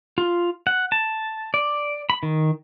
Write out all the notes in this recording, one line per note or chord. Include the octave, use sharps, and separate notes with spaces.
F4
F#5
A5
D5
B5
D#3